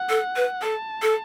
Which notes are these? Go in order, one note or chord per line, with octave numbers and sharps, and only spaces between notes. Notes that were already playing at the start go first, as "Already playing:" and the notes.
Already playing: F#5
A4
B4
A4 A5
A4